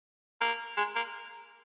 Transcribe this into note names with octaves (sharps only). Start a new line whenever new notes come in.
A#3
G#3
A#3